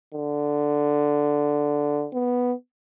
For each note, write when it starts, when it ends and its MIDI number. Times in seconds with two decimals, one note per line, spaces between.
0.14 2.08 50
2.13 2.53 59